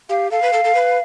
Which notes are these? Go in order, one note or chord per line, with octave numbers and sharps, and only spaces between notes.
G4 F5
A4 F5
B4
A4
A4
B4